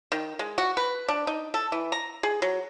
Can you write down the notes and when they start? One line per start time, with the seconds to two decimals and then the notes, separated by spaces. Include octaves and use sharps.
0.12 D#3
0.39 G#3
0.58 F#4
0.77 B4
1.08 D4
1.27 D#4
1.54 A4
1.72 E3
1.92 A#5
2.23 G#4
2.42 F#3